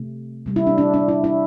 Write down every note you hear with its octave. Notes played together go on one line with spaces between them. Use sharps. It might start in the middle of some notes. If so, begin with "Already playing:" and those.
Already playing: C3 A3
C3 G3
E4
D4
D4
D4
E4
E4